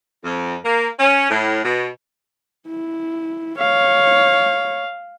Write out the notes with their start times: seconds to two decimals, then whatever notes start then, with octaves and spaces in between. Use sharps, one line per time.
0.25 F2
0.65 A#3
0.99 C#4
1.30 A2
1.65 B2
2.68 E4
3.59 C#5 F5